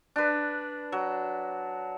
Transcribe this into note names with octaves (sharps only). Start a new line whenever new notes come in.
D4 B4
F#3